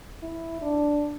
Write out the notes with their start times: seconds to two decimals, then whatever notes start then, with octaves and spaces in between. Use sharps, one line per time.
0.23 E4
0.62 D4